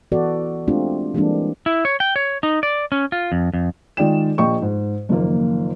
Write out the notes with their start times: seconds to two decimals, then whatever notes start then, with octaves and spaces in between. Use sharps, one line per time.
0.12 E3 B3 F#4 A4 D5
0.68 G#3 A3 C4 D4 F4 G4
1.15 E3 G3 G#3 A#3 C4 D4
1.66 E4
1.85 C#5
2.00 G5
2.16 C#5
2.43 D#4
2.63 D5
2.92 C#4
3.12 F4
3.32 F2
3.54 F2
3.97 D#3 G#3 F4 D5 G5 E7
4.38 A#1 F3 D#5 G5 C#6
4.62 G#2
5.09 F#1 D#3 F3 A#3